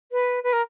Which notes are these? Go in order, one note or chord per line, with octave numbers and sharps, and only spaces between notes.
B4
B4
A#4